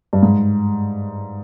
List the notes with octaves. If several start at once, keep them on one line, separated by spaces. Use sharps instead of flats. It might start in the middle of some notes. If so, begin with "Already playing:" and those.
G2
G#2